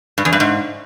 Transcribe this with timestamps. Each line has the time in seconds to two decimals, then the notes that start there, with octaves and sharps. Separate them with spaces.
0.18 G2
0.25 E2
0.33 G2
0.40 G#2